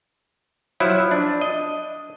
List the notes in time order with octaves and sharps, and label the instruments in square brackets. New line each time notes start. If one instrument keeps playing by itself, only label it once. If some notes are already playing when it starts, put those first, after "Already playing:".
[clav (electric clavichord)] F3 F#3 E4
D4
D#5